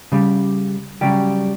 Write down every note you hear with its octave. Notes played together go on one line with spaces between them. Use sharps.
C#3 G3
C#3 F#3 G3 G4